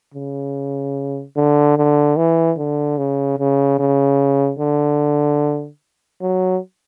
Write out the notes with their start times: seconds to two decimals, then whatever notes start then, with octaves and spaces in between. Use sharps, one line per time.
0.15 C#3
1.37 D3
1.77 D3
2.17 E3
2.58 D3
2.98 C#3
3.39 C#3
3.79 C#3
4.59 D3
6.22 F#3